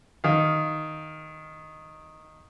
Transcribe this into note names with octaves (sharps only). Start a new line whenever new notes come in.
D#3 F5